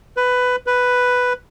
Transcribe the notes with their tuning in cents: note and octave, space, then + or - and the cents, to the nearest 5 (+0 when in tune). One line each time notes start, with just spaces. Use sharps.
B4 +15
B4 +5